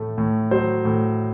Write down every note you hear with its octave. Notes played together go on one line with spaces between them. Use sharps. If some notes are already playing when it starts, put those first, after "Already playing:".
Already playing: A2 A3
A2
F#3 C5
A2